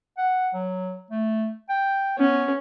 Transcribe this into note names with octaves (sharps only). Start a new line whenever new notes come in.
F#5
F#3
A3
G5
B3 C#4